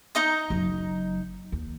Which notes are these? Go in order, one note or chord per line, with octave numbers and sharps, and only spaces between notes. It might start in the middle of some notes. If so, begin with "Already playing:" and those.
D#4 D#5 A#5
F#1 F#3
D#2